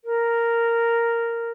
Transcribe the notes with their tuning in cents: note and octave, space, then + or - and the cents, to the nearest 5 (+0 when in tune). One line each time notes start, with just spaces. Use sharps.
A#4 -5